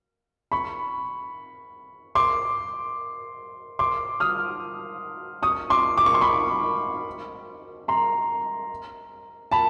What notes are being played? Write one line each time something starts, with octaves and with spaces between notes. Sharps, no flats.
B5 C#6
C6 D6
C6 D6
D#6 F6
C#6 D#6
C6 D6
D6
C#6
C6
B5 C#6
A#5 C6
A5 B5